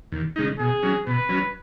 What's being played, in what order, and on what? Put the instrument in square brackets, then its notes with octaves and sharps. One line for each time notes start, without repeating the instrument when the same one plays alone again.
[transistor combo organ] D#2
C#3 G#3 D#4
[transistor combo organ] B2 [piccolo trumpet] G#4
[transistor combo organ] F#3 C#4
[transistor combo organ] B2 [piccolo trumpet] B4
[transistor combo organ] F#3 C#4